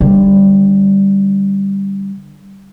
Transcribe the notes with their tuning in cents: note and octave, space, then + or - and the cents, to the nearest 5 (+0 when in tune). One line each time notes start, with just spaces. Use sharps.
D3 +0 G3 +0